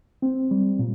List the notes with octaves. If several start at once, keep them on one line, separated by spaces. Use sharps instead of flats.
C4
G3
A#2